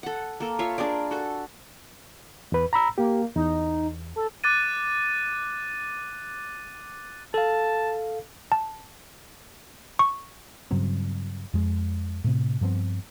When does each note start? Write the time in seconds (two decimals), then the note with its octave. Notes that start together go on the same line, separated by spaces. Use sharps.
0.03 A4 F#5
0.40 A#3 A4
0.59 F4 C#5 E5 F5
0.78 D4 G#4 A#4 D5
1.11 F#4 A4
2.52 E2 B4
2.73 A#5 B5 E6
2.98 A#3 G4
3.35 E2 D#4
4.16 A4
4.44 D6 F#6 A6 D#7
7.34 A4 F5 A5
8.52 A5
9.99 C#6
10.71 G2 C#3 F#3 C4
11.54 F2 G#3
12.24 A2 C3
12.61 G2 F3 B3 C4